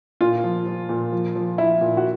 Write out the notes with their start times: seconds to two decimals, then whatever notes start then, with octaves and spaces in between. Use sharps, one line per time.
0.21 A#2 F4
0.44 F3
0.66 F3
0.89 A#2
1.12 F3
1.35 F3
1.58 F3 E4
1.81 A#2
1.97 F#4